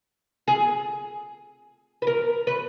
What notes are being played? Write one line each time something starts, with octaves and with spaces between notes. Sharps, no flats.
G#4
B4
A#4
B4